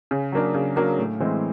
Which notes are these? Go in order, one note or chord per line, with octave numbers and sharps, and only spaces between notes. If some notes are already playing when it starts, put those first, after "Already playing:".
C#3
F#3 A#3 D4
C#3
F#3 A#3 D4
A2
E3 G#3 C4